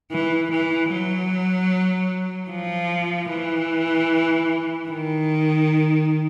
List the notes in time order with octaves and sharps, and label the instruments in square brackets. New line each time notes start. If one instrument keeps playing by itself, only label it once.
[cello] E3
E3
F#3
F3
E3
D#3